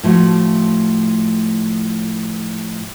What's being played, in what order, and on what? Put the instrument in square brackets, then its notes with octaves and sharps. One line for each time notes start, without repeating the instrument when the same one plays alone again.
[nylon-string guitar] A2 F3 A3 F4 F#4